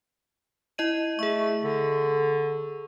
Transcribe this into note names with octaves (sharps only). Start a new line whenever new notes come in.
E4 D#5 D#7
A3 G#4 C#6
D3